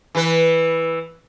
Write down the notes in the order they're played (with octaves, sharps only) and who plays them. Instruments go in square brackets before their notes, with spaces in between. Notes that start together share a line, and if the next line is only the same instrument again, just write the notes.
[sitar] E3 B4